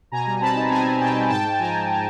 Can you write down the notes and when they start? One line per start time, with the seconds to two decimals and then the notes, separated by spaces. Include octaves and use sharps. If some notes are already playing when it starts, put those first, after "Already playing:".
0.12 B2 G#5 A#5
0.26 G3
0.41 C4 A5 B5
0.56 D#4
0.70 C4 G#5 A#5
0.86 C4
1.00 B2 G5 A5
1.15 B2
1.30 G#2 G5 A5
1.45 G#3
1.59 F3 G#5 A#5
1.74 G#2
1.88 G#5 A#5